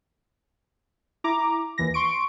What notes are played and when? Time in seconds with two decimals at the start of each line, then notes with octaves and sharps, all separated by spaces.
1.24 E4 A#5 D6
1.78 D#2 E3 A#6
1.94 C6 C#6 D7